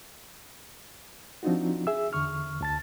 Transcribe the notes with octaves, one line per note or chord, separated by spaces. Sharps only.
F3 C4 D4 D#4 F4 F#4
G#4 E5 E6
E2 D3 C#6 F6
D2 A5 A6